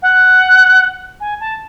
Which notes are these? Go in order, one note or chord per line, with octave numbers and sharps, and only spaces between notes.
F#5
G#5
A5